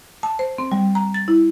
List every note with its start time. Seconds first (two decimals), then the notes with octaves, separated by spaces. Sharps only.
0.23 A5
0.39 C5
0.58 C4
0.72 G3
0.95 A#5
1.14 A6
1.28 E4